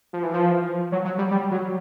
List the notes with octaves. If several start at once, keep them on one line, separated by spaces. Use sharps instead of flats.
F3
E3
F3
F#3
F#3
G3
G3
F#3